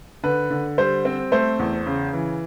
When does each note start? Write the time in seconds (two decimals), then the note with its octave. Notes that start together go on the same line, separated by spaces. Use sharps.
0.23 D3 B4
0.50 D3
0.78 G3 C5
1.05 C4
1.32 A3 C5
1.59 E2
1.86 C#3
2.13 E3